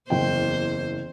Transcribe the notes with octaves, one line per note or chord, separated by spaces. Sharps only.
F#1 E2 C5 G5